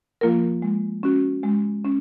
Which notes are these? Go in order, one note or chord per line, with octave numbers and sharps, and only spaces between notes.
F3 A#3 F4 A#4
G#3
C#4 F#4
G#3
C#4